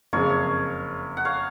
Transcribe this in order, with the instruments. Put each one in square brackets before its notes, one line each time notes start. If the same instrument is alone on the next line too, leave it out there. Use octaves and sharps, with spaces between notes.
[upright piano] F#1 F2 C#3 [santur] C#5 F5
[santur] F#5
C#5 F5